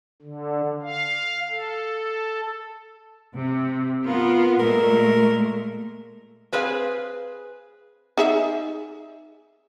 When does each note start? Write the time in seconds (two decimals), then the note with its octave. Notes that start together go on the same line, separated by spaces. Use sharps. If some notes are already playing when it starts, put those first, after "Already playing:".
0.22 D3
0.82 F5
1.51 A4
3.34 C3
4.04 B3 F4 A#4
4.60 A#2 G#3 A3 A#4
6.53 C4 G#4 B4 C5 F5 G#5
8.17 D#4 G#4 E5